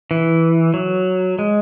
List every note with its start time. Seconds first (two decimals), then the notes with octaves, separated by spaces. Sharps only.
0.11 E3
0.74 F#3
1.39 G#3